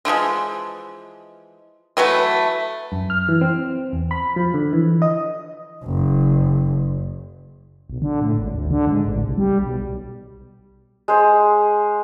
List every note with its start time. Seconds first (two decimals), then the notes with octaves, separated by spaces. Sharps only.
0.05 D3 E3 F3 G#3
1.97 E3 F#3 A3 B4
2.92 F#2
3.10 F6
3.28 E3
3.41 C4
3.92 E2
4.11 B5
4.36 F3
4.54 D3
4.73 E3
5.02 D#5
5.84 F#1
7.90 B1
8.02 D3
8.21 A2
8.38 G#1
8.54 D2
8.71 D3
8.87 G#2
9.07 A1
9.23 C2
9.38 G3
9.63 B1
11.08 G#3 C5